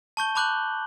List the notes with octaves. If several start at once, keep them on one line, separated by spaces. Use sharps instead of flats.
A5 C#6 G6 G7
A5 B5 D6 F#6 G6 F#7